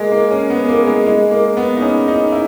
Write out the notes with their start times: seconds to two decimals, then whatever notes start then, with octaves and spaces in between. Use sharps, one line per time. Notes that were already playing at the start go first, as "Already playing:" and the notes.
Already playing: G#3 A#3
0.12 A#3
0.31 C#4
0.50 B3
0.69 A#3
0.87 G#3
1.06 G#3
1.31 A#3
1.57 B3
1.77 D#4
1.82 C#4
2.08 D#4
2.32 E4